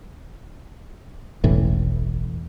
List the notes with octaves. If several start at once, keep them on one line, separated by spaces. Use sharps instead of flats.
E1 A1 A2 E3